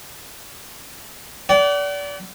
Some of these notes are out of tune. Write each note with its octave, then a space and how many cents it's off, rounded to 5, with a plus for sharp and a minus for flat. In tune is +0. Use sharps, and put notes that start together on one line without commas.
D5 -30 F#5 +40